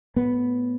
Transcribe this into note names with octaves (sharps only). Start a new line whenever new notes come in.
A2 B3